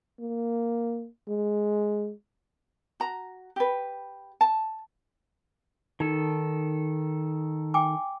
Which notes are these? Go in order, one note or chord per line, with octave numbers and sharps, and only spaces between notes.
A#3
G#3
F#4 A#5
G4 B4
A5
D#3 D#4 A4
G5 G#5 D6